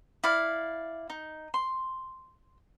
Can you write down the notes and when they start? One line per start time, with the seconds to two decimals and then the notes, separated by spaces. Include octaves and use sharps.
0.24 E4 D5 F5
1.10 D#4
1.54 C6